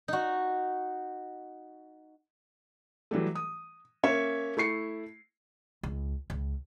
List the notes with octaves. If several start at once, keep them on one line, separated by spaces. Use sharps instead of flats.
D#4 F#4
E3 F#3 G3 A3
D#6
A#3 C#4 C#5 E5
A3 E4 C#6 C7 C#7
C#2
C#2